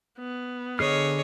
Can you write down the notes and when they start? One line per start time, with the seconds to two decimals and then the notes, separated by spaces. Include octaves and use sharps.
0.18 B3
0.79 D3 G#4 C#5 D#5 F6